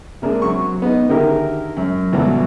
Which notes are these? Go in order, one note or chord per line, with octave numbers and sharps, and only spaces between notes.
C3 A#3 D4 G#4
C3 F#3 C#6
B3 D#4
D3 D#3 E4 G4 G#4 A#4
F#2
G2 B2 D3 E3 F#3 D4